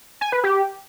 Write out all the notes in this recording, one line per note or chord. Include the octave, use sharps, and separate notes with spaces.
G#5
B4
G4